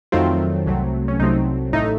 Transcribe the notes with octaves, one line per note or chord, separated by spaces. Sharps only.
F2 D#3 F#3 A3 C4 F4
C2 C3 F#3 A3 C4
C#4
C2 C3 F#3 A3 C4 D#4
A1 A2 A3 D#4